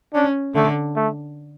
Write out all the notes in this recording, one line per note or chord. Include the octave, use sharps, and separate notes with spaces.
C#4 D4
D3 A3
A3